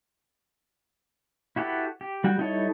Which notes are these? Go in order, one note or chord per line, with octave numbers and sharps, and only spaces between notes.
E4 F#4 G4 A4 B4
G4
G3 F#4 G5
G3 D#4 E4 A4 C#5